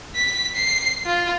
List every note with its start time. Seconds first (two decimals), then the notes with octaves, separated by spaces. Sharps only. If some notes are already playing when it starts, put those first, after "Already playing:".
0.16 B6
0.55 C7
1.06 F4